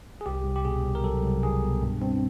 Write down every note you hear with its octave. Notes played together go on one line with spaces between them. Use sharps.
G#4
C2 G4
C2
G4
B2 G#4
C2
A#4
F#3 A4
C2
C2 G#4
B2
G2
G2 C4